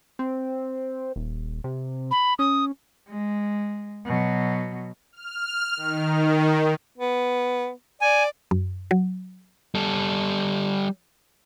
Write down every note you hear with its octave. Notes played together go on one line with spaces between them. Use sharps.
C4
D#1
C3
B5
C#4 D#6
G#3
B2 F#3
F6
D#3
B3
D5 G#5
F#2
F#3
G3 A4